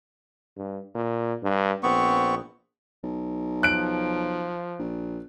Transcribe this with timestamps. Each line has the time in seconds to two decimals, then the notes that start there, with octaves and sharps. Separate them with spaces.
0.57 G2
0.95 A#2
1.43 G2
1.83 A#1 B3 C4 C#6
3.03 B1
3.63 F3 F#6 D7
4.79 A#1